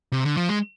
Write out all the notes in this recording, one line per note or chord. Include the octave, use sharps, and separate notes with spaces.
C3
D3
F3
G#3